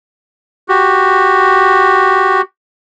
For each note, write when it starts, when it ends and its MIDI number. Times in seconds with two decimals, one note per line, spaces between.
0.69 2.41 66
0.69 2.41 67